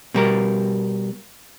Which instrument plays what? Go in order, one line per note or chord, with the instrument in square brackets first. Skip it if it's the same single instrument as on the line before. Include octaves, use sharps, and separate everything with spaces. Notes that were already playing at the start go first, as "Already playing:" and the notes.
[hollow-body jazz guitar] B2 G3 A#4